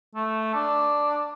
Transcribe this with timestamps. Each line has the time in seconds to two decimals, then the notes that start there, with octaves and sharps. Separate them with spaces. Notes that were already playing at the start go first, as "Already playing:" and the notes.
0.15 A3
0.54 D4